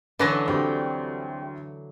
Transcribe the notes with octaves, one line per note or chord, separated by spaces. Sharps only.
D3 E3 F#3 C#4 B4 A5 A#6
D2 G3 C4 G5